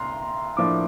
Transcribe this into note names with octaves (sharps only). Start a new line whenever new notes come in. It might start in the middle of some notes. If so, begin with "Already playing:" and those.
Already playing: C2 A#5 C6
A2 F3 A#3 D4 D6